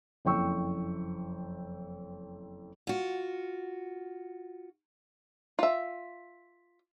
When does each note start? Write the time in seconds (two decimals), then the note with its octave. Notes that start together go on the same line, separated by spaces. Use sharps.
0.25 F#1 F2 E4 G5 C#6 E6
2.87 F4 F#4
5.59 F4 E5